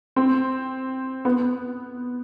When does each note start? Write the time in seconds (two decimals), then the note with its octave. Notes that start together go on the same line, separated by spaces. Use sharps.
0.16 C4
1.25 B3